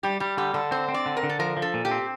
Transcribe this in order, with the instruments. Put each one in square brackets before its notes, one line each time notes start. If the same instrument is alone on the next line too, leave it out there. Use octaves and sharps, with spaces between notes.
[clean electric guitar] G3 [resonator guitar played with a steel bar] G4
[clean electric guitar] G3 [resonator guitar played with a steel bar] G4
[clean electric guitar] D3 [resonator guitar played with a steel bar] G4
[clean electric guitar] D3 [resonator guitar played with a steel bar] A4
[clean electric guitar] C4 [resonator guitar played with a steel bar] C5
[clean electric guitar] C4
[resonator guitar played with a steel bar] D5
[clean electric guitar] D3
[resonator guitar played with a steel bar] A#4
[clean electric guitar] D3
[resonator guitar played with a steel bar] A4
[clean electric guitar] F3 [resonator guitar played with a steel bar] A#4
[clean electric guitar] F3
[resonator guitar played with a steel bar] A4
[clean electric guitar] A#2
[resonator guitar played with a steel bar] G4
[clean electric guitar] C4